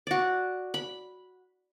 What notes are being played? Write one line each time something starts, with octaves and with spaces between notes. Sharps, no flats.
F#4 D5
B5